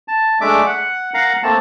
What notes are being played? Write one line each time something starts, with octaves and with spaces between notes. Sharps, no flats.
A5
G#3 A3 D4 E5 D6
F#5
A#4 F5 F#5 A#5
A3 A#3 C4 A5